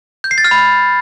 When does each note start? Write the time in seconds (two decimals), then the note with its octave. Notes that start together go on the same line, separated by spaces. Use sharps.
0.24 G6
0.31 C7
0.38 A6
0.44 F6
0.51 B5